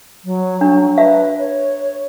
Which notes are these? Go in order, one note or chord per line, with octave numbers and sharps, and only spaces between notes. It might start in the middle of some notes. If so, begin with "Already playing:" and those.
F#3
F#3 D4
B4 E5
C#5